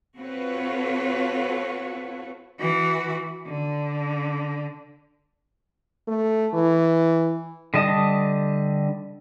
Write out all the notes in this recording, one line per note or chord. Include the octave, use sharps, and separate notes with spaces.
C4 F4 F#4 A4 B4 C#5
E3 F#4
D3
A3
E3
D3 G3 D#5 A5 D#6